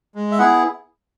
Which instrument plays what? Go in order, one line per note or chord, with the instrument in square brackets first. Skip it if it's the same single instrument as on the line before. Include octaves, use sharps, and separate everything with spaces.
[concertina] G#3
E5
B3 E4 G#4 F#5